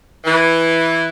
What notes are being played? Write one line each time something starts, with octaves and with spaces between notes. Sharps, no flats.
E3